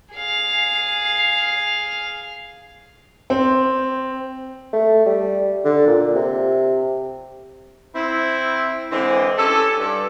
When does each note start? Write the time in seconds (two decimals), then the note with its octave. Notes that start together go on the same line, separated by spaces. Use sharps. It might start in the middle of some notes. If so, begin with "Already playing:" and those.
0.14 G#4 F5
3.30 C4
4.73 A3
5.06 G3
5.64 D3
5.87 A#2
6.15 C3
7.95 C4 E4
8.92 D3 E3 G#3 C4
9.38 C#4 G4 A4
9.78 G2